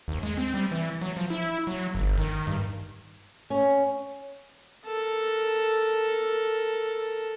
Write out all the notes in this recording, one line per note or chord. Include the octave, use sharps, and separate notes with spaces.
D#2
G#3
C4
G3
E3
F#3
F3
E4
F#3
G1
D#3
G2
C#4
A4 A#4